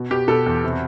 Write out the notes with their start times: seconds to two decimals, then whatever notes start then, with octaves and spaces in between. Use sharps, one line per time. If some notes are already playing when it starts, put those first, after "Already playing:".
Already playing: B2
0.11 B2 G4
0.28 B2 A4
0.46 E2
0.64 C3